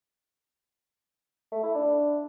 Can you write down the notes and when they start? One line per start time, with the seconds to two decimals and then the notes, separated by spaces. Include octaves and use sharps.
1.51 A3
1.63 E4
1.75 D4